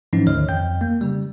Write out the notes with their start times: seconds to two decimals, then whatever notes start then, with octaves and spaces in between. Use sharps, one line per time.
0.13 G#2 E3 F3 C#4 D#4
0.27 D2 D3 D#3 C#5 D#5 F6
0.49 F2 G5 G6
0.81 A#3
1.01 C#3 G3